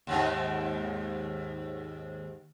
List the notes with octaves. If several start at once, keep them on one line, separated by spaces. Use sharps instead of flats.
D#2 G#2 D#3